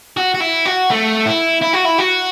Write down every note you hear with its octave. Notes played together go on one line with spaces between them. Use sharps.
F#4
F#4
E4
F#4
A3
E4
E4
F#4
E4
F#4